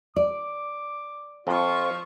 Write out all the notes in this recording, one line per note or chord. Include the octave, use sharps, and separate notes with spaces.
D5 D6
F2 F3 F4 C#6